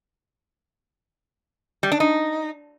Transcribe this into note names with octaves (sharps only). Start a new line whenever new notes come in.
G3
D4
D#4